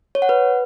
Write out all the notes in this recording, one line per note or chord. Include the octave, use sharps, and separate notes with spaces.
C#5
F#5
B4